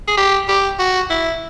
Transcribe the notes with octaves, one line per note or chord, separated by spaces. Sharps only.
G#4
G4
G4
F#4
E4